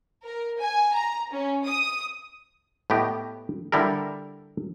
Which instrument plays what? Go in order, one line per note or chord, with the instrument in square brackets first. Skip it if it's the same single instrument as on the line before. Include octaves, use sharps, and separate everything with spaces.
[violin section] A#4
G#5
A#5
C#4
D#6
[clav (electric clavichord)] A2 B3 G4 D#5
D3 G3 E4 A4 A#4